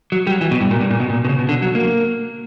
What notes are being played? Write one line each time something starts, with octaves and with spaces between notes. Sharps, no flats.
F#3
G3
F#3
E3
B2
G2
A#2
G2
A#2
B2
A#2
B2
C#3
B2
D3
F#3
A#3